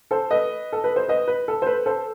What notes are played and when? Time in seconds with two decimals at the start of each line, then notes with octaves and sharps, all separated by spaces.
0.11 A4 C5
0.31 B4 D#5
0.72 A4
0.84 B4
0.96 C5
1.08 B4 D#5
1.27 B4
1.48 A4
1.62 C5
1.67 B4
1.86 A4 C5